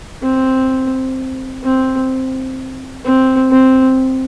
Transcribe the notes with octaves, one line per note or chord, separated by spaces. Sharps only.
C4
C4
C4
C4